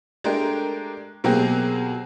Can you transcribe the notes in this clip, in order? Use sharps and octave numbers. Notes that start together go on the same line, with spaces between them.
G#3 A3 D4 G4 A#4
B2 F#3 A#3 C4 G4 G#4